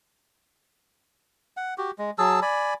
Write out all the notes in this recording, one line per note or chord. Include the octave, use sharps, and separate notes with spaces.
F#5
F#4 G4
G#3
F#3 G#4 A5 E6
D5 G#5 B5